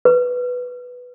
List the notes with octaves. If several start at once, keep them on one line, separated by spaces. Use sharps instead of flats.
B4